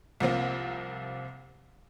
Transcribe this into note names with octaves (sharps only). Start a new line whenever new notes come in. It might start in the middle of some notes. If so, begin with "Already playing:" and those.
C2 F3 A#3 C4